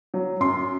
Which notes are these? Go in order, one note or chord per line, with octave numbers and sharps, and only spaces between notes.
F#3
F#2 C6